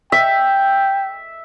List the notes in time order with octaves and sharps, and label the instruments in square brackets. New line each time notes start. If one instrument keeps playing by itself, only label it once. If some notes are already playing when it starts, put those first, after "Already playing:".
[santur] E5 [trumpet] G5